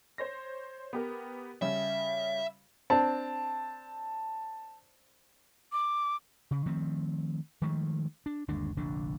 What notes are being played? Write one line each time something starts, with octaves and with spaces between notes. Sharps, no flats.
C5 C#5 A#6
B3 G4 A#4
C#3 G3 C#4 E5
C4 D4 A5
D6
C#3
D#3 F3 A3 C4
D#3 F3 G#3 A3
D4
G1 D#2 G#3 D4
F1 A#1 D3 D4